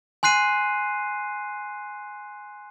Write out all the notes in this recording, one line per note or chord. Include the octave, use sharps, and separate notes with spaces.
G#5 C6 F#6 C7 D#7